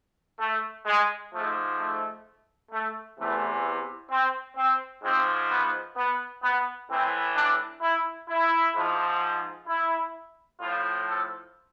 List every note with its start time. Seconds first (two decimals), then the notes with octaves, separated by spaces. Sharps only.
0.40 A3
0.86 G#3
1.32 G#2 F3 A3
1.79 A3
2.72 A3
3.18 E2 C3 E3 A3
4.11 C4
4.57 C4
5.03 G#2 F3 C4
5.50 B3
5.97 B3
6.43 B3
6.89 A2 E3 C4
7.35 D4
7.82 E4
8.29 E4
8.75 G#2 F3
9.67 E4
10.60 A2 F3 F4
11.07 A4